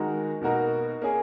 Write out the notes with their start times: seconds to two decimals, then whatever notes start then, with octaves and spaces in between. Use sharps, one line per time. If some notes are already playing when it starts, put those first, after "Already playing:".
Already playing: D#3 G#3 D#4 F#4 A#4
0.41 B2 A#3 D#4 F#4 A#4
1.02 A#3 C#4 G#4